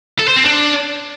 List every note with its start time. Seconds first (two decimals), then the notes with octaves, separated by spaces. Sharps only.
0.19 A4
0.28 C5
0.36 C4
0.45 D4